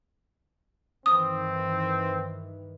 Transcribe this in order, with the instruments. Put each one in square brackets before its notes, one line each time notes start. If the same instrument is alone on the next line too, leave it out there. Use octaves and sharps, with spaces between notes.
[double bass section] G2 D#3 E3 [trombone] C4 [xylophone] D#6